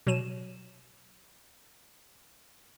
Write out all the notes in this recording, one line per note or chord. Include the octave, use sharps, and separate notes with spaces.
B2 F#3 D#7 E7